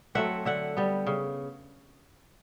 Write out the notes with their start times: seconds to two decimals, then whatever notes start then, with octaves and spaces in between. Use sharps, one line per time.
0.15 F#3 A3 C4 E5 F#5
0.45 D3 E5 F#5
0.77 G3 B3
1.07 C#3